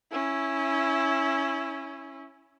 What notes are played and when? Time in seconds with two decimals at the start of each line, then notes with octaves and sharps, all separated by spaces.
0.11 C#4 E4